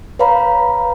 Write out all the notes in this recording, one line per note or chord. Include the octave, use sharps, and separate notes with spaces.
B4 C#5 F5 A#5 B5